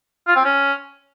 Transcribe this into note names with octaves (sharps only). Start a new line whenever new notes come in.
F4
C4
C#4